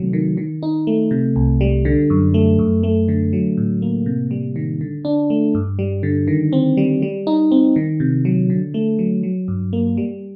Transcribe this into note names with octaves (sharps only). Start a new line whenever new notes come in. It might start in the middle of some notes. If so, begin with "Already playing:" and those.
Already playing: C3 D#3 F#3 A3
D#3
D#3
D#4
A3
C3
C2
G3
D3
F#2
A3
F#2
A3
D3
F#3
A2
A#3
C3
G3
D#3
D3
D4
A3
G2
G3
D3
D#3
C4
G3
G3
D#4
C4
D#3
C3
F#3
D3
A3
F#3
F#3
G2
A#3
G3